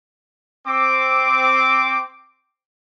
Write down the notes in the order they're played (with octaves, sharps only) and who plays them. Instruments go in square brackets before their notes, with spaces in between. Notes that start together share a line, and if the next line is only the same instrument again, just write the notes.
[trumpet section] C4 D6